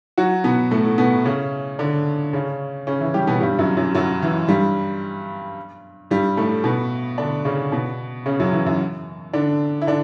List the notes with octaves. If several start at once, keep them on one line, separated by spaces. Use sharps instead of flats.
F#3 F#4
B2 B3
A2 A3
B2 B3
C#3 C#4
D3 D4
C#3 C#4
C#3 C#4
E3 E4
G3 G4
B2 B3
G2 G3
F#2 F#3
F#2 F#3
F#2 F#3
E3
G2 G3
G2 G3
A2 A3
B2 B3
D3 D4
C#3 C#4
B2 B3
C#3 C#4
F#2 F#3
E3
F#2 F#3
D3 D4
E4
D3 D4